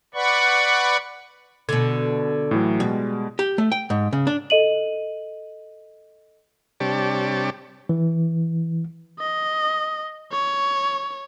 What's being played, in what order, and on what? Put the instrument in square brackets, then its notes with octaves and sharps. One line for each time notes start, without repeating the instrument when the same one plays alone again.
[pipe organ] B4 D5 F#5 B5 C#6
[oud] B2 D3 [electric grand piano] G#6
[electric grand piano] A2 E3 F#3
[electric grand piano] B2 G#3 [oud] G3
[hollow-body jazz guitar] G4
A3
G5
G#2
C#3
D4
[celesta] A4 D#5 D#7 F#7
[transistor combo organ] C3 G3 D4 G4 C#5 A5
[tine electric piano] E3
[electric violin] D#5
C#5